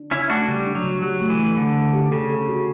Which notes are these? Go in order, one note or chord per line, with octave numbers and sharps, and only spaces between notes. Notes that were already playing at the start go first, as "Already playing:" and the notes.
Already playing: D4
C#3 C#4 E4
A3 D4 F#4
C#3 G3
D4
F#3
C#3
F#3 G4
A3
E3
A3
D3 A3
A3
G4
C#3 A4
A4
F#4